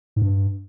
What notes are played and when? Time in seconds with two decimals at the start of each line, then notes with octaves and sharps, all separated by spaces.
0.16 G#2
0.22 G2